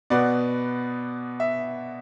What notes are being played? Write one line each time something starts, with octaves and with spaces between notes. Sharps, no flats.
B2 B3 D5
E5